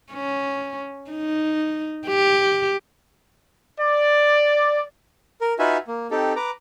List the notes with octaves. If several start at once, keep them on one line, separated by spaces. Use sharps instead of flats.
C#4
D#4
G4
D5
A#4
D#4 F4 F#4 B4 E5 G#5
A#3
C4 D#4 G4 A4
B4 A#5 D6